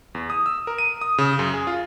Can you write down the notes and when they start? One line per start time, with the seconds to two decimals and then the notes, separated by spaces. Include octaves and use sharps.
0.15 E2
0.30 D#6
0.46 E6
0.67 A#4
0.78 D#7
1.01 D#6
1.18 C#3
1.39 F#2
1.54 G#4
1.67 F4